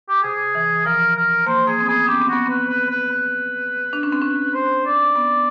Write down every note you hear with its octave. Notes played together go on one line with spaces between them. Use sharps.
G4
C3 G#4
E3
F3 A#4
A#4
A#3 C5
A#3 G#4
C4
B3 G#4
C#4 G4
C4
B3 F#4
C4 B4
B4
B4
B4
D4
C#4
C4
C#4
C5
D5
B3